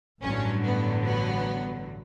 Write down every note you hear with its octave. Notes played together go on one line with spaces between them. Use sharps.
A1 G2 D3 F#3 C#4
B3
B3